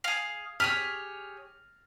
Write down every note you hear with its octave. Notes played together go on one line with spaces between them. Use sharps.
G#4 F5
G4 G#4 C#5 F6